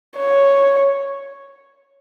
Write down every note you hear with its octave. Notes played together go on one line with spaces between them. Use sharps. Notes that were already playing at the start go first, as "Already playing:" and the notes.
C#5